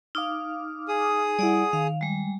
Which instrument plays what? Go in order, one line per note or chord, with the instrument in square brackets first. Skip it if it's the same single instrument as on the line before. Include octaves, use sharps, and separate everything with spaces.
[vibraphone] D#4 [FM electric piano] F5 D6 F6
[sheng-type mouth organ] G#4 D#6
[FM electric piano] G3 E4 [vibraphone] D5 F#5
[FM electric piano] D#3 [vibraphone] F5
[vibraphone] G3 G#3